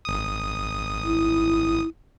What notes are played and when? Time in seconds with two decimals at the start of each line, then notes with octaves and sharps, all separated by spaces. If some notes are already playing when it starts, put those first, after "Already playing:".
0.05 G#1 D#6
1.04 E4